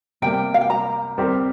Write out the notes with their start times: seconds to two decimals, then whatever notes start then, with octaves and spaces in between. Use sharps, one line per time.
0.22 C3 G3 A#3 G5
0.54 F5
0.61 G5
0.70 A#5
1.18 G3 C4 G4 A#4